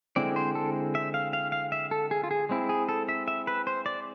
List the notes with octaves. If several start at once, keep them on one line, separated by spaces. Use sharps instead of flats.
D3 G#3 C4 E4 D5
C5
A4
E5
F5
F5
F5
E5
A4
G#4
F4
G#4
G#3 C4 E4
G#4
A4
E5
E5
B4
C5
D5